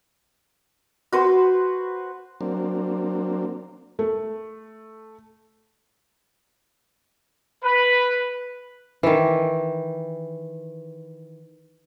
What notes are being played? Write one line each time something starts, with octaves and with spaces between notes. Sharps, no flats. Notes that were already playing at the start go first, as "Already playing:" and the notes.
F#4 B4 C5
F#3 A#3 C4 D4
A3
B4
D#3 E3